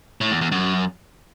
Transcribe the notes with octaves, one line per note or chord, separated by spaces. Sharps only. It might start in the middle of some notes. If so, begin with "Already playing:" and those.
A2
E2
E2
F#2